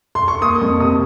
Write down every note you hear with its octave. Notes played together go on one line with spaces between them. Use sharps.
C6
C#6
A#3 D#6
F2 C#6
C3 D#6